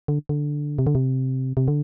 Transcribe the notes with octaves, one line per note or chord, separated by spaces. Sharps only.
D3
D3
C3
D3
C3
C3
D3